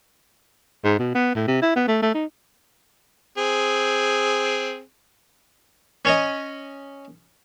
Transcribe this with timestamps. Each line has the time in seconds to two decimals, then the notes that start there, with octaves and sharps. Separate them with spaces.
0.84 G#2
0.99 B2
1.15 B3
1.35 A2
1.47 C3
1.62 E4
1.76 B3
1.88 A3
2.02 A3
2.14 D#4
3.38 C4 G#4
6.05 C#4 C#5 D#5